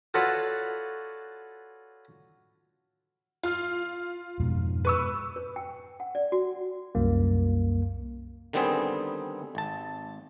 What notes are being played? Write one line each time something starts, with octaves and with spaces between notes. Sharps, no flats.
F4 F#4 A4 B4 C#5 D5
F4 F6
F2 G#2 B2
B4 C#6 E6
B4
G5
F#5
D5
F#4
C2 F#2 A#3
D3 D#3 G3 B3 C4 G#4
G#1 A5